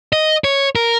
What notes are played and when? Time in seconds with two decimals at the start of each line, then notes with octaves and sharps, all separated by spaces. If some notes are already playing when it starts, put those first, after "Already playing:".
0.13 D#5
0.44 C#5
0.75 A#4